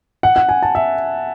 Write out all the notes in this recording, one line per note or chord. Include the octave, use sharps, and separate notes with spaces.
F#5
F#5
G#5
A5
E5